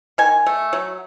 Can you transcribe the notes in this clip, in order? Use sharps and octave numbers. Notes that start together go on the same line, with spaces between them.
D#3 G#5
A3
F#3